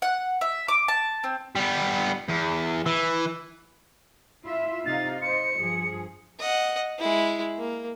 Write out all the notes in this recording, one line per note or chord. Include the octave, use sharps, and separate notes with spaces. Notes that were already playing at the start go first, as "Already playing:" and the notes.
F#5
E5
D6
A5
C4
G3 B3
E2
E3
E4 F4 E5
C3 D#4 F5 A6
C5 D#5 C#7
G2 F3 G#4
D#5 F#5
G#3 E4
A#3